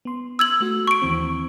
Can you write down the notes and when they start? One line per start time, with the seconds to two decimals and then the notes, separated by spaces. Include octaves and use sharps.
0.05 B3 C6
0.39 E6 G#6 F#7
0.61 A3 F#4
0.88 C#6 D7
1.02 D#2 E3 C4